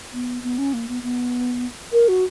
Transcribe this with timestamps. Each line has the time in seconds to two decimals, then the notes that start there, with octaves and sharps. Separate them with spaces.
0.13 B3
0.43 B3
0.58 C#4
0.74 A#3
0.89 B3
1.03 B3
1.93 A#4
2.08 F#4